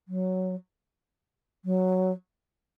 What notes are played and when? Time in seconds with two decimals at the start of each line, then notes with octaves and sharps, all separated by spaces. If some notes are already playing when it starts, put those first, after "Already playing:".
0.08 F#3
1.65 F#3